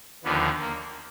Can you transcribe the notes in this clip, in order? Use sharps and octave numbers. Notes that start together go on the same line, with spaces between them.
D#2 D3 F3 B3
A#3